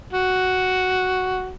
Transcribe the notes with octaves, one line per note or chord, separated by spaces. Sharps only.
F#4